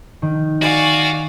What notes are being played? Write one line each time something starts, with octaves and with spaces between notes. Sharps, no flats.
D#3
F#4 D5 F5 G#5